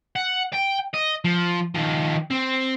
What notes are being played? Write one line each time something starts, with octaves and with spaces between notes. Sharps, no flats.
F#5
G5
D#5
F3
D#3 F3
C4